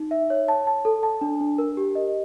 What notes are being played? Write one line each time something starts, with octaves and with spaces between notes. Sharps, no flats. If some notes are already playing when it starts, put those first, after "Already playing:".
Already playing: D#4
E5
C#5
A5
A5
A4
A5
D4
D4
A#4
G4
D#5